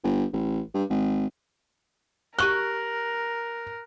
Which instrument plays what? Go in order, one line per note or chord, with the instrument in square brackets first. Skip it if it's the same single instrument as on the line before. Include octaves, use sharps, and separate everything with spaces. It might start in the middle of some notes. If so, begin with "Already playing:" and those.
[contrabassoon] G1
A1
G2
G#1
[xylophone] G4 C#6 G7 [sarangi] A#4 [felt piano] F#6